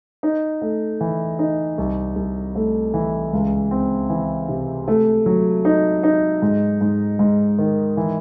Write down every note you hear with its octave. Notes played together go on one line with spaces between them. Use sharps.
D#4
A3
E3
D#4
C2
C2
A3
E3
C#2
C4
E3
C3
A3
F#3
D#4
D#4
G#2
G#2
G#2
D#3
E3